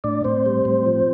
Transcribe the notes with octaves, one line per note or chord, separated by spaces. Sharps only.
A2 D4 D5
A2 C4 C5
G3
A2
F3